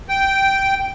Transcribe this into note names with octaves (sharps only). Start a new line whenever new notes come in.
G5